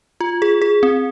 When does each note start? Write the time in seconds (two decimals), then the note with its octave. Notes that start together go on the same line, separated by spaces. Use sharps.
0.21 F4
0.42 G#4
0.62 G#4
0.83 C4